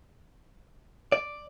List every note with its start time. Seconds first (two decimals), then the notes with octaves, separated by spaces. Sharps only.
1.12 D5